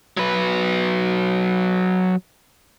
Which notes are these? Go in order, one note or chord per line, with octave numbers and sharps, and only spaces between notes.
F#3 B4